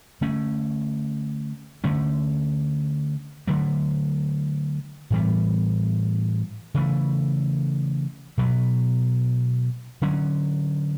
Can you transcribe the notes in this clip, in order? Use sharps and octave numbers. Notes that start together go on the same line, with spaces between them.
D3 A3 C#4
D3 A3 C#4
D3 F#3 A3
A2 E3 G3 B3
C#3 E3 A3
B2 F#3 B3
D3 F#3 C#4